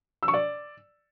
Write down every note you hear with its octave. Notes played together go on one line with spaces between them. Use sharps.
E6
C#6
D5